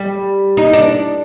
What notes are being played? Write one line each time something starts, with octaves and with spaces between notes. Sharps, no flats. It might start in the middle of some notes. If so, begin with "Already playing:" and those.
Already playing: G3
D#4
D4